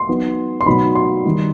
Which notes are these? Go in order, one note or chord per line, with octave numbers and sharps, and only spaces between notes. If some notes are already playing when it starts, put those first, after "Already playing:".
Already playing: C6
F#3 B3 D#4
C6
B2 F#3 B3 D#4 B5
C6
D#3 G3 D#4